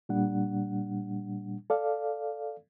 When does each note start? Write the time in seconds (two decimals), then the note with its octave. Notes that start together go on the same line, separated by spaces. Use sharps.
0.09 A#2 G3 D4 F#5
1.70 A4 D5 F5